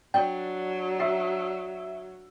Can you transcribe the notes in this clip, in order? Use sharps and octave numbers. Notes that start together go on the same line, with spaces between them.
F#3 D4 G5
E5 E6 C7